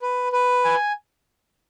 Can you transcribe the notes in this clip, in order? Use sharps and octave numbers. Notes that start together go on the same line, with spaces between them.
B4
B4
G#5